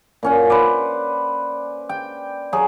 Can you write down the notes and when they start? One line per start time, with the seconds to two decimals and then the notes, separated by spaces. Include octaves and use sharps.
0.23 A#2 C#4 F#5
0.50 B4 C5 D5
1.89 G5
2.53 F#3 G#4